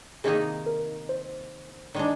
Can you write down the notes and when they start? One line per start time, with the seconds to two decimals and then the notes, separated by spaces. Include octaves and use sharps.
0.24 C3 D#3 A#3 D#4 G#4
0.66 A#4
1.09 C5
1.95 D#3 G#3 D4 D5